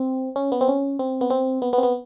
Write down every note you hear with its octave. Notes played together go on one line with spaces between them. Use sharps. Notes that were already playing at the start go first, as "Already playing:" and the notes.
Already playing: C4
C#4
B3
C4
C#4
C4
B3
C4
B3
B3
C4
B3